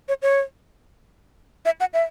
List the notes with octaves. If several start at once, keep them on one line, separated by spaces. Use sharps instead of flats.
C#5
C#5
E5
F#5
E5